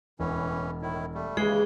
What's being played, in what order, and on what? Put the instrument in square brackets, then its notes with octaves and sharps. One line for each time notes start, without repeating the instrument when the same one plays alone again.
[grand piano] E1 [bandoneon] A2 E3 C#4
[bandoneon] A2 D#3 E4
G3 A3
[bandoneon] D#2 C#3 E3 [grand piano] G#3 [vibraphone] G#4